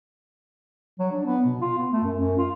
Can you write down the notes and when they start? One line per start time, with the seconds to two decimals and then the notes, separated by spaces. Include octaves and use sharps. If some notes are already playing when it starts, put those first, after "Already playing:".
0.99 F#3
1.12 D4
1.25 B3
1.46 B2
1.61 F4
1.78 B3
1.92 A3
2.03 F#2
2.19 F#2
2.38 F4